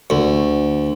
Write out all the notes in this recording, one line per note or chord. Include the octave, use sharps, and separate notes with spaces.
D2